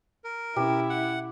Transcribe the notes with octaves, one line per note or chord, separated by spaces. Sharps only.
A#4
B2 C#4 E4 G4
F#5